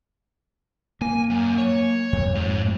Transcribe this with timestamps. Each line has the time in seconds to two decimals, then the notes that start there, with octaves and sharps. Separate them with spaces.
1.01 A#3 G#5
1.30 F#2
1.58 C#5
2.13 F2
2.35 G#2